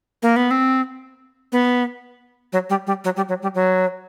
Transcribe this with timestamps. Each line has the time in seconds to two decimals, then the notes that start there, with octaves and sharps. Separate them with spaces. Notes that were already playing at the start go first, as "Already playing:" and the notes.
0.22 A#3
0.36 B3
0.51 C4
1.52 B3
2.53 F#3
2.70 G3
2.87 G3
3.04 F#3
3.16 G3
3.29 F#3
3.42 G3
3.55 F#3